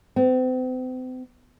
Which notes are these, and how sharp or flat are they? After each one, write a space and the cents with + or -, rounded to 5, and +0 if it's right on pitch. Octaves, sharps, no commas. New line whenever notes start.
C4 -40